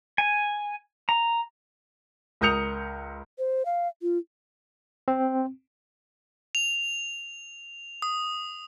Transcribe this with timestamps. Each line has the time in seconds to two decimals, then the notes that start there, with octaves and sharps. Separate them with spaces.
0.18 G#5
1.09 A#5
2.41 C#2 A#4 D#6 G6 C#7 F7
3.39 C5
3.66 F5
4.02 F4
5.08 C4
6.55 F7
8.02 D#6